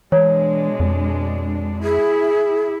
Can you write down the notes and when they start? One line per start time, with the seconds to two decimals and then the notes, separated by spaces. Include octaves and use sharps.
0.12 B2 E3 G#3 D4 C#5
0.80 F2
1.83 E4 G#4